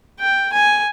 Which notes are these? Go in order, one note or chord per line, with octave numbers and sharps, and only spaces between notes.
G5
G#5